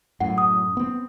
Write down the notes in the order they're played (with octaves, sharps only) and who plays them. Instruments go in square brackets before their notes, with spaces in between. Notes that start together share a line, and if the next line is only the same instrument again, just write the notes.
[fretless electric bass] F#2 A2 [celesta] F#5
[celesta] D#6
[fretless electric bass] B3 C4